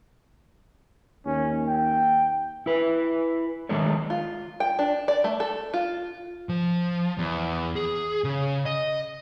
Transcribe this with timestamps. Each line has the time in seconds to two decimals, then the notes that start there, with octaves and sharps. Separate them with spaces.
1.26 D#2 C#4
1.68 G5
2.66 E4 B4
3.69 D#3 G#3 A3 D4 A#4 C#5
4.10 F4
4.60 G5
4.79 D4
5.08 D5
5.24 A3
5.40 A4
5.74 F4
6.49 F3
7.18 E2
7.76 G#4
8.24 C#3
8.66 D#5